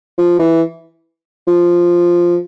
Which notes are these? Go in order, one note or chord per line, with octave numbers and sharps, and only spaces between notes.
F3
E3
F3